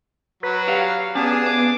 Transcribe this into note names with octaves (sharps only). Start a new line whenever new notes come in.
F#3 B4
G4 D5 F5 F#5
B3 C#4 D4 G#4 A5
B4 F5 D6